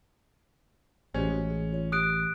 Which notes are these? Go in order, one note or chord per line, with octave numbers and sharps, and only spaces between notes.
A1 G#3 C#4 F#4 G4 C5
E3 F#4 G#4
G#4
F4 C#5
G4 D#6 F#6 D7